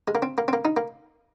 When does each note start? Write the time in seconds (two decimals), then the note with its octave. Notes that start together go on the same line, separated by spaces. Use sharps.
0.08 G#3
0.15 A#3
0.22 C4
0.38 A#3
0.48 C4
0.53 A#3
0.65 D#4
0.77 A#3